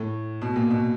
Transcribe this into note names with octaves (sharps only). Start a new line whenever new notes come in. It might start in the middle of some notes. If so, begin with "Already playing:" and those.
Already playing: A2
B2
A#2
B2